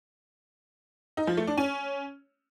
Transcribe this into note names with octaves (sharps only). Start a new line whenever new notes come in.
D#4
F3
A3
D4
C#4